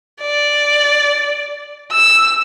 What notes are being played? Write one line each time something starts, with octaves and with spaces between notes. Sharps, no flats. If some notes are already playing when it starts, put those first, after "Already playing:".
D5
E6